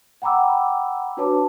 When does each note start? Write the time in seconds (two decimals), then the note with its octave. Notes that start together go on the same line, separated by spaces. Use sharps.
0.22 F#5 G5 A#5 B5 D6 E6
1.17 D4 F#4 B4 C#5 A5 D6